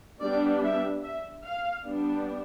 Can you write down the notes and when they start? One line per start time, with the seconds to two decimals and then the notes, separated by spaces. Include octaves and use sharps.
0.21 G3 B3 D4 D5
0.63 E5
1.03 E5
1.45 F5
1.85 G3 B3 D4